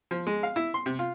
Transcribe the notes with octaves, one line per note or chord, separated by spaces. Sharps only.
F3
G#3
F5
E4
C6
C3
F4